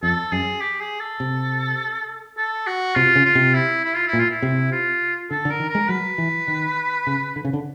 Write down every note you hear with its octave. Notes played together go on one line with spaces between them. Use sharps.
F2 A4
F#2 G#4
G4
G#4
A4
C3
A4
F#4
C3 F4
C#3
F4
C3
E4
E4
F4
E4
A#2
F4
E4
C3
F4
D3 A4
D3
A#4
D#3
A#4
G#3
F#3 B4
E3
D#3
C#3
D3
C#3
D3